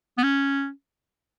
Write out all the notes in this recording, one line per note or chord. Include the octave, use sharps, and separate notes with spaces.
B3
C#4